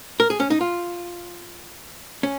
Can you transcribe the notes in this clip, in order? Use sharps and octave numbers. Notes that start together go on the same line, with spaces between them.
A#4
G#4
C#4
D#4
F4
C#4